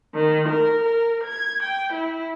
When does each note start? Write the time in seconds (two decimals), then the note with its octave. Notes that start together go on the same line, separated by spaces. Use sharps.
0.14 D#3
0.48 A#4
0.83 A#4
1.23 G#6
1.63 G5
1.92 E4